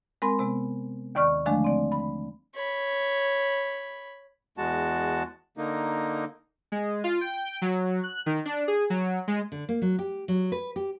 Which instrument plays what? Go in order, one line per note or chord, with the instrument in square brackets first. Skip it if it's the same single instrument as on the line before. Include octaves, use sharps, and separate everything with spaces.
[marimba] G#3 C4 A#4 B5 C6
C3 G#3 B3
D#2 D#3 D5 C#6 F6
D3 D#3 F3 G#3 A3 D4
C4 D5
B5
[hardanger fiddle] C#5 B5
[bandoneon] E2 G#3 F#4 A5
D3 A#3 D#4
[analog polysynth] G#3
F4
G5
F#3
F#6
D#3
D4
G#4
F#3
G#3
[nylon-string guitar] D3
A#3
F#3
G4
F#3
B4
G4